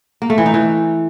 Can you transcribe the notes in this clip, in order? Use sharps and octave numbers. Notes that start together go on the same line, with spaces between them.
A#3
A3
E3
D#4
E3